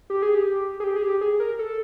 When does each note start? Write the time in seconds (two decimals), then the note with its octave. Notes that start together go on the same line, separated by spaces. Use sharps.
0.10 G4
0.22 G#4
0.35 G4
0.80 G#4
0.84 G4
0.96 G#4
1.02 G4
1.21 G#4
1.40 A#4
1.59 A4